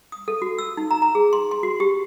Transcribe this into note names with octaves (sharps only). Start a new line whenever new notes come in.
D#6
A4
F#4
E6
D#4
A#5
A#5
G#4
C6
C6
F#4
G4